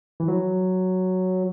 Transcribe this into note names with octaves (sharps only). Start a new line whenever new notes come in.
E3
F#3